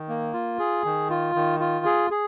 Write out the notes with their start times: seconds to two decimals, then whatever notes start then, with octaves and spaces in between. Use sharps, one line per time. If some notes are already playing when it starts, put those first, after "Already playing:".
Already playing: D#3
0.09 A#3
0.33 F4
0.59 G#4
0.85 D#3
1.10 F4
1.35 D#3
1.60 F4
1.85 G#4
2.11 G#4